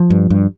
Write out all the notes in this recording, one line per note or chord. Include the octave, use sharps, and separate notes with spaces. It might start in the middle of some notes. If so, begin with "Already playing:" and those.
Already playing: F3
G2
G2